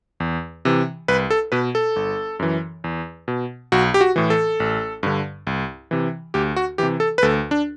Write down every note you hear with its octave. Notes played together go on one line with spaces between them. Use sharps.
E2
C3 E3
C2 B4
A4
B2 B4
A4
G1
F#2 E3
E2
B2
B1 F#4
G4
F#4
A2 E3
A4
A1
G2 D3
C2
C3 E3
D2 G4
F#4
C3 E3 G4
A4
B4
D2 A4
D4